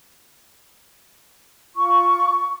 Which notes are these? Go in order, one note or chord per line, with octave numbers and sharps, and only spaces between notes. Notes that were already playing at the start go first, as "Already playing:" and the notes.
F4 C#6